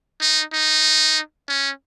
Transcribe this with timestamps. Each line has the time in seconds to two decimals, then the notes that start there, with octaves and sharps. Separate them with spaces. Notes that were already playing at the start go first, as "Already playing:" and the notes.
0.21 D#4
0.53 D#4
1.48 C#4